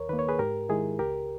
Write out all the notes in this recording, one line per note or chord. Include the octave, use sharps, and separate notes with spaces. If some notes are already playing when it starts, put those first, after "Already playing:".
Already playing: D#2 A#4 C#5
D#3 A#3 B4
C#5
G#4 B4
G#2 G4 A#4
D#3 G#3 E4 G#4
C#2 G4 A#4